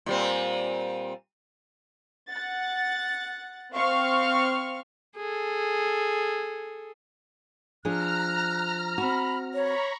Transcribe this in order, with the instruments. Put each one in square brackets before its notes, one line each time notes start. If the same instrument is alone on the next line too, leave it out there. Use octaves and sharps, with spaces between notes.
[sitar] A#2 G3 C4
[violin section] F#5 A6
C4 F5 C#6 F6
[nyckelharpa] G#4 A4
[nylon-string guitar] F3 D4 G#4 [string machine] A#5 F6 [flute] F#6
[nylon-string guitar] C4 F#4 [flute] B5
[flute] C#5 [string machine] A#5 B5 C#6